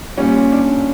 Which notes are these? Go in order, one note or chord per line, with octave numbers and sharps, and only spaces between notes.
A#2 G3 C#4
D4